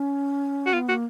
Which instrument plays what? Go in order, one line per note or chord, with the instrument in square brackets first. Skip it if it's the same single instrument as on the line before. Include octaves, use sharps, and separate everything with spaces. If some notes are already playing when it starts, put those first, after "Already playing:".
Already playing: [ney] C#4
[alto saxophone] F#4
[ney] B3 [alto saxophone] F4
[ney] A#3 [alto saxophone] F#4